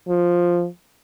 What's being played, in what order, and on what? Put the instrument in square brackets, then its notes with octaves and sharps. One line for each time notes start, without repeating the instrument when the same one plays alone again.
[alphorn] F3